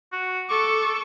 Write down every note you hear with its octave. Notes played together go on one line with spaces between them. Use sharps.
F#4
A4 C#6 D6